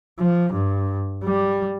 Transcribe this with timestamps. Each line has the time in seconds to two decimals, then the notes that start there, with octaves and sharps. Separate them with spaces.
0.20 F3
0.54 G2
1.24 G3